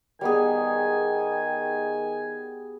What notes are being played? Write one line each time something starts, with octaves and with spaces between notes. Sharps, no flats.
D#3 G3 B3 G#4 G#5